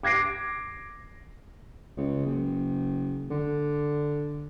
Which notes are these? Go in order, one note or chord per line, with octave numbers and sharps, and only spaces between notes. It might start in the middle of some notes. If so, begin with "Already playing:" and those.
D6 G#6 A#6 C7 D7
C#2
F#1
D3